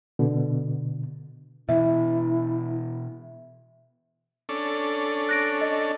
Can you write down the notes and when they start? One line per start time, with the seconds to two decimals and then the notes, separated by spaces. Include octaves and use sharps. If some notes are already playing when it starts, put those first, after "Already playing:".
0.19 B2 D3
1.69 B2 E3 E4 E5
4.49 C#4 D4 A4
5.29 F#6 A#6 D7
5.61 D#5